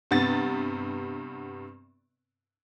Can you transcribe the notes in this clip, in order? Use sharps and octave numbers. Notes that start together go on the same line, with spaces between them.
G2 C3 B3 A6